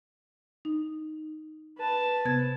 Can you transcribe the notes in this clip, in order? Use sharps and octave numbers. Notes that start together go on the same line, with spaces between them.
D#4
B4 A5
C3 B3 G#6